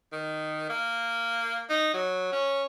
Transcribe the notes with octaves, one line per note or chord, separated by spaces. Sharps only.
D#3
A#3
D#4
F#3
C#4